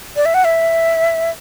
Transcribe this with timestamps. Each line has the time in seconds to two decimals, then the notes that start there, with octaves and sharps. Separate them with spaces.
0.16 D5
0.25 E5
0.34 F#5
0.45 E5